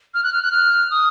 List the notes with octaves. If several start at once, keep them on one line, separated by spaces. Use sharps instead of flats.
F6
F#6
F6
F#6
F6
D#6